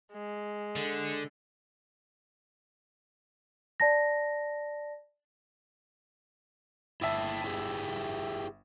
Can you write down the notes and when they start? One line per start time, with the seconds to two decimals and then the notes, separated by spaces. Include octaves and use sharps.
0.13 G#3
0.76 D3
3.80 D5 A5 A#6
7.01 G1 E4 E5 G5 A5
7.44 E4 G4 G#4